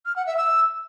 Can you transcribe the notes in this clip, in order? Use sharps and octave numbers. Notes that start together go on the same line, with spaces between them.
F6
F#5
E5
E6